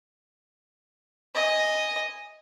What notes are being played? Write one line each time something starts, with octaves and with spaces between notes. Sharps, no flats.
D#5 G#5